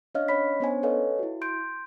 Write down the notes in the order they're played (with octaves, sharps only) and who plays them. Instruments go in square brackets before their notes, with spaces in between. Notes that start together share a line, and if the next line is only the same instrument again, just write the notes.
[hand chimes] C#4 D4 C#5 D#5 F5 F6
C#4 C#5 D#5 B5 B6
B3 C#4 D4 C5 C#5 G#5
A4 B4 C#5 D#5 F5 G#5
E4 F#4
C6 G6 D7